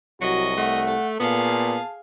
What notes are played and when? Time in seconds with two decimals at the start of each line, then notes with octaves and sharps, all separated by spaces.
0.21 C2 F#3 F#4 D#5 C#6
0.58 A3 F#5
0.88 A4
1.20 A#2 B3 G#4 F5 A5